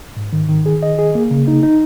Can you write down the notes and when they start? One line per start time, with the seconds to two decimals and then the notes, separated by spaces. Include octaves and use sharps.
0.16 G#2
0.33 D#3
0.49 D#3
0.66 G#4
0.83 D#5
0.99 G#4
1.15 A#3
1.31 C#3
1.48 D#4
1.63 D#4